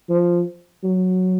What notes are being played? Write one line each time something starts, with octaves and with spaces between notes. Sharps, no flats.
F3
F#3